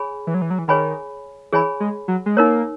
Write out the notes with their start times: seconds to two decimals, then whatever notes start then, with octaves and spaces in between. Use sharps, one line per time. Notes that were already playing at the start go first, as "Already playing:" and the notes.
Already playing: G#4 C#5 G#5 B5
0.27 E3
0.34 F#3
0.42 E3
0.50 F#3
0.59 E3
0.68 D#3 G#4 C#5 G#5 B5
1.53 E3 G#4 C#5 G#5 B5
1.80 G#3
2.08 F#3
2.26 G#3
2.37 A#3 D#4 A#4 C#5